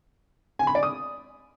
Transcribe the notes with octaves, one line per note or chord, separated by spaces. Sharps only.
G#5
B5
D5
D#6